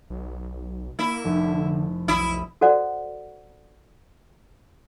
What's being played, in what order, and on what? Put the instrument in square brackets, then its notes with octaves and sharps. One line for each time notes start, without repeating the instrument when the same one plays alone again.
[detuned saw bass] B1
[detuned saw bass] A#3 [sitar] E4
[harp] F1 [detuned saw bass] D3
[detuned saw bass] B1 [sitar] E4 [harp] B5 D#6
[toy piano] F#4 A4 C5 D5 F#5